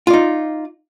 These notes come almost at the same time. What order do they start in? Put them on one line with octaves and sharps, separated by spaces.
F4 D5 D#4